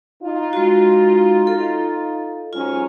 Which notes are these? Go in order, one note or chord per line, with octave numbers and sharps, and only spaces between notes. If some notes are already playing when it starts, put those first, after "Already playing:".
D#4 F4
G#3 F#4
A4
G#2 F#3 C#4 F4